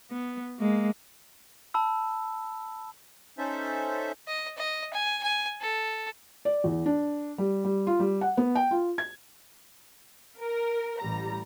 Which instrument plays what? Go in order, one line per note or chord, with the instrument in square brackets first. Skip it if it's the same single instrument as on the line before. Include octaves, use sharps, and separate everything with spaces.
[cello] B3
G#3 A#3
[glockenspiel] A5 B5 E6
[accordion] C#4 D#4 A4 C5 E5
[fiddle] D#5
D#5
G#5
G#5
A4
[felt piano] D5
E2
D4
G3
G3
F4
G3
F#5
B3
G5
F4
G#6
[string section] A#4
A1 G3 A#5